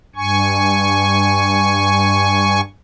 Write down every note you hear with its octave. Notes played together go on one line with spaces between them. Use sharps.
G2 G#5 C#6